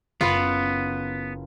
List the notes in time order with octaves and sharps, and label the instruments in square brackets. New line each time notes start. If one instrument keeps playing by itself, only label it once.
[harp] F#1 [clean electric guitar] B3 [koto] F4 B4